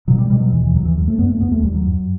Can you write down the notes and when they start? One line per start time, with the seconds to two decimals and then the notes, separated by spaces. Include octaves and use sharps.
0.07 B2 F#3
0.18 G3
0.30 B2 G3
0.40 F#3
0.52 D#2 E3
0.64 E3
0.74 D#2 F#3
0.85 E3
0.96 F#2 F#3
1.07 A3
1.18 F#2 B3
1.29 A3
1.40 D#2 B3
1.52 A3
1.63 D#2 G3
1.74 F#3
1.85 F#2